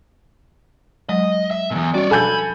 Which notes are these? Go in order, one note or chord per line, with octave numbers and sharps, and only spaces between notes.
F#3 G#3 D#5
E5
E2 A#2
G3 C#4 F#4 C#5 D5
B2 F3 A4 G#5 B5 G6